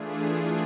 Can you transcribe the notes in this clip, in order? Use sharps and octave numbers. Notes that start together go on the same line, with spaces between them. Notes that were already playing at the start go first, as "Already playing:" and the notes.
Already playing: E3 A3 D4 F4 G#4